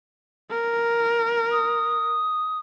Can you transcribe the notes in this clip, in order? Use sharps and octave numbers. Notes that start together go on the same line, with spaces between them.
A#4
D#6